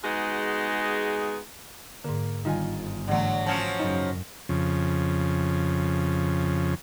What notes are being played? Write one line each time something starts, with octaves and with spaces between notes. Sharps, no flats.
G#3 B3 D#4 F#4 G#4
G#2 D3 A#3
G1 D3 D#3 G3 D#4 F4 G#5
G#2 D3 E3 F#3 A3
F3 F#3 C#4 A5 G#6 C#7
F#2 C#3 D#4
F2 C#3